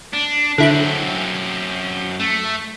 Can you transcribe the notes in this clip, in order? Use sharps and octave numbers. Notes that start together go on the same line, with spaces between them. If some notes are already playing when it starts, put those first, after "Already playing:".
D4
F#2 D3 C4 E4 F#6
A3